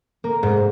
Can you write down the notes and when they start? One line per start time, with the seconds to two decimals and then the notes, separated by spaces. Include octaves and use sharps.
0.24 A#3
0.43 G#2